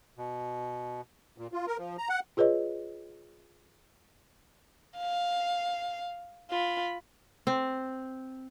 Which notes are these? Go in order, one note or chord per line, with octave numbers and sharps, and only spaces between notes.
B2
A#2
F4
A#4
F3
A#5
F#5
F4 G#4 B4 C#5 D#5
F5
F4 B5
C4